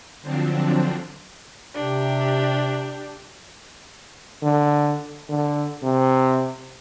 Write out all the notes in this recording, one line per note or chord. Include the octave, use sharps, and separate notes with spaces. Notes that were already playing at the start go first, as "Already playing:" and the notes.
D3 F3 F#3 C4 D4
C3 D4 G4
D3
D3
C3